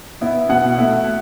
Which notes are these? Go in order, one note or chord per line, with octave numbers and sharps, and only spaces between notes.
B3 E4
B2 F#5
A3 E4